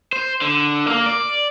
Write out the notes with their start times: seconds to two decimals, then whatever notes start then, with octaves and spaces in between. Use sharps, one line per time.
0.13 C5
0.42 D3
0.88 A#3
1.06 D5